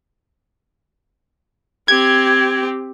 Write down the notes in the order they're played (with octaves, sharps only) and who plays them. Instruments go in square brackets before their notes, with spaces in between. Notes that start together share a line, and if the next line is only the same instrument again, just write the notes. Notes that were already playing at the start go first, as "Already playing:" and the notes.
[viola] C4 G4 [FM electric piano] G#6